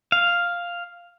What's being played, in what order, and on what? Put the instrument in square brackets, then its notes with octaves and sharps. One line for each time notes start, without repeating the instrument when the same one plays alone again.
[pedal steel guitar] F5